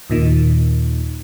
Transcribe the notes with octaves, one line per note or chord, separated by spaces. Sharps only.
D#2 A#2 D#3